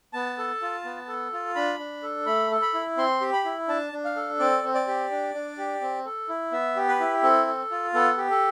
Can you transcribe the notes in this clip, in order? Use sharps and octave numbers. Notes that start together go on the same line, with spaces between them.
B3 A5
A4
F4
B3
A4
F4
D4 B5
D4
A4
A3 B5
A4
B5
E4
C4 C6
G4
B5
E4
D4 A5
D4
F5
A4
C4 D5
C4
D5
G4
D4
D4
G4
C4
A4
E4
B3 E5
G4
B4
E4
C4 A4
A4
F4
B3 A4
G4
A4